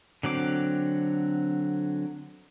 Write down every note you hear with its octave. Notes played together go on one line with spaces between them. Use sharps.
D3 F#3 C4 D6